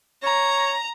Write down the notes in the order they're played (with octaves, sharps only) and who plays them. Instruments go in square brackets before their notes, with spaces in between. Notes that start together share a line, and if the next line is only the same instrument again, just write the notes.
[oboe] C#5 [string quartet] A#5